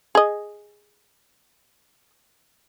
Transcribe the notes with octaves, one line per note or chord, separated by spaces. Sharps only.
G#4 D#5